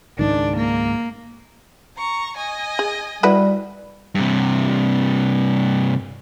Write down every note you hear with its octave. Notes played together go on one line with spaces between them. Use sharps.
C#2 G#2 D#3 D4
A#3
A#5 C#6
D#5 G#5
G#4
G3 E4 F#4 B4
G2 C3